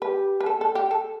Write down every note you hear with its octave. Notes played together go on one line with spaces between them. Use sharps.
G4 B4
B4
A4
A4
G4
A4